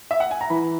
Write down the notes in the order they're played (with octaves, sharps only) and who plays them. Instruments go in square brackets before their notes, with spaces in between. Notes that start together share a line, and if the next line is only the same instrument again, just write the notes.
[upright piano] E5
F#5
G#5
A#5
[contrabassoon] E3 [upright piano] B5